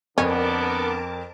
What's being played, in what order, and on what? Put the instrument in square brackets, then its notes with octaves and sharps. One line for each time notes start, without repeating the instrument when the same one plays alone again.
[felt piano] F2 [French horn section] D3 B3 [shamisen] C#4 [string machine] A#4 A5 D6